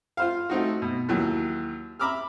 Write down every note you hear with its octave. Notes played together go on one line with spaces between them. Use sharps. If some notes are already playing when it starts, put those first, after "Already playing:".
F4 C5 F5
A3 C4 D#4 F#4
B2
D#2 E3 F#3
E5 A#5 B5 D6 E6 F6